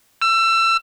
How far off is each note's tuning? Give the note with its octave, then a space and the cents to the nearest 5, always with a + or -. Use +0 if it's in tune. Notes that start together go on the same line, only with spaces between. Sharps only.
E6 +25